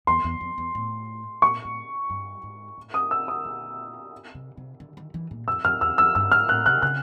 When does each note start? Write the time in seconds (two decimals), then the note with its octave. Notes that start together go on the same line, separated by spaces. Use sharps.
0.07 E2 C6
0.24 E2
0.41 F2
0.58 E2
0.75 A2
1.42 A#2 C#6
1.65 A2
2.10 G2
2.43 G#2
2.78 A2
2.94 D#6
3.11 E6
3.28 D#6
3.45 A#2
4.35 C3
4.57 C3
4.80 D3
4.97 D#3
5.14 E3
5.31 A#2
5.48 F2 E6
5.64 F2 F6
5.81 E2 E6
5.98 F2 E6
6.15 G2 E6
6.32 G#2 F6
6.48 A2 F#6
6.66 C3 F#6
6.82 C#3 F#6